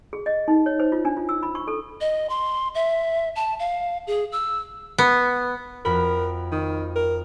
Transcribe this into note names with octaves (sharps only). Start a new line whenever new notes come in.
G#4
D#5
D#4
C#5
C5
F4
D4
F4
E6
B5
C#6
A4
D#5
C6
E5
A5
F5
G#4
E6
B3
F2 F#4 A#4 B5
D#3
A#4